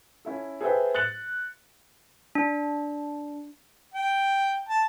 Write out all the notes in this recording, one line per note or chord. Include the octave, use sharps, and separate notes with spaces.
C#4 E4 A4
G#4 A4 B4 C5 E5 G5
F#6 A6 C#7 F#7
D4
G5
A5